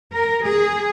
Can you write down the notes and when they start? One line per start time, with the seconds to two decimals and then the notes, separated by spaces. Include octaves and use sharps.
0.13 A#4
0.44 G#4